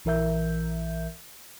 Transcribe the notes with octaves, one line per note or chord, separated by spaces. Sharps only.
A#1 E3 A#4 E5 G6